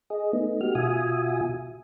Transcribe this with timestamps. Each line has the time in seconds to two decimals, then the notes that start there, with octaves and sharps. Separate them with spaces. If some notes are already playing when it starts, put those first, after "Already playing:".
0.10 G#4 D#5
0.33 A3 B3 D#4
0.61 F#4 G4 F6
0.75 B2 F4 F#4 E5 G#5 D#6